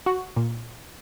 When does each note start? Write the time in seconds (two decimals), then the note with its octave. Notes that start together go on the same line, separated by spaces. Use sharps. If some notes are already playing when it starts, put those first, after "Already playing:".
0.06 F#4
0.36 A#2